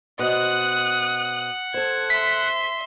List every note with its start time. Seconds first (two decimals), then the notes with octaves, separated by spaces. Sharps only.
0.19 B2 C5 D#5 F#5 D#6 F#6
1.74 A4 C5 G#6
2.10 E5 C6 B6